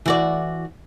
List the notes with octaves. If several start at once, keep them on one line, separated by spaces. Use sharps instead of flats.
E3 F#4 D5